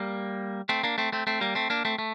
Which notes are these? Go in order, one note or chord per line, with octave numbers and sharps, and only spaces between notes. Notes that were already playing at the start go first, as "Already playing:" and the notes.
Already playing: G3 A#3
A3 C4
A#3 D4
A3 C4
A3 C4
A3 C4
G3 A#3
A3 C4
A#3 D4
A3 C4
A3